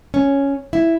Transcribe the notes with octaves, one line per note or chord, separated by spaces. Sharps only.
C#4
E4